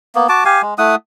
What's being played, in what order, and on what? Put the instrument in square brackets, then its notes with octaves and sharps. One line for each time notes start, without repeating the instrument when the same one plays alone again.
[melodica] A#3 B3
F#4 A5 D6
G4 F5 G#5
G#3
A3 E4 F#5 D#6